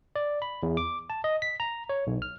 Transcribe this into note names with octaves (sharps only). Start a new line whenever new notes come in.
D5
B5
E2
D6
A5
D#5
B6
A#5
C#5
B1
F6